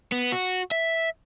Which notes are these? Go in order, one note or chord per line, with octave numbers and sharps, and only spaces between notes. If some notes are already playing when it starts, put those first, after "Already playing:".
B3
F#4
E5